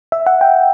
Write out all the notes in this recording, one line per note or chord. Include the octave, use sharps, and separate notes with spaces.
E5
F#5
G5